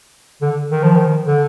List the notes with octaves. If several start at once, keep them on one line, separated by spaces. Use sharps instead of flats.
D3
D#3
F3
D#3
D3